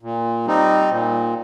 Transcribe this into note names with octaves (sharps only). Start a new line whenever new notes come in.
A#2
G3 C4 D#4
A#2